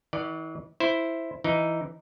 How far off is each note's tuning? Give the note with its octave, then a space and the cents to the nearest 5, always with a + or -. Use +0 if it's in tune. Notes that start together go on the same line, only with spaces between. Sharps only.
E3 -40 D5 +20 F#5 +30
E4 +0 C5 +0
E3 +0 D#4 +0